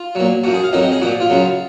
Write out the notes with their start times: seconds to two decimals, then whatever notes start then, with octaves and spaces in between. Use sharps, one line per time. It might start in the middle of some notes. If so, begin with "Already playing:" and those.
Already playing: F4
0.15 A#2 F#3
0.44 F3 F#4
0.47 F#2
0.54 G#4
0.64 F5
0.73 F2 D#3 F#3 D#5
0.83 D#5
0.92 G#4
1.02 F3 F#4
1.04 A#2
1.20 F4
1.30 F#2 C#3 F#3